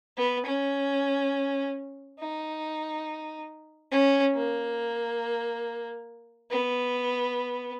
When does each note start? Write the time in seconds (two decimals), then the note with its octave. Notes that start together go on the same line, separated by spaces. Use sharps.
0.17 B3
0.46 C#4
2.19 D#4
3.92 C#4
4.35 A#3
6.51 B3